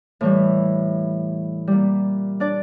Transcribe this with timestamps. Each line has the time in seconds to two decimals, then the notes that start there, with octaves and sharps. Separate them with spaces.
0.21 A2 E3 G3
1.67 A#2 G3
2.40 D4 D5